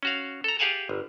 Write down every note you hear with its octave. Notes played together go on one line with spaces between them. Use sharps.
C#4 F#4 F5
A4 A#5
G4 G#4 F5 F#5 G#5 A5
G1